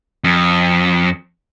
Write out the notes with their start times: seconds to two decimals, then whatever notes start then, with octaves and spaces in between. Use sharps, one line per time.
0.24 F2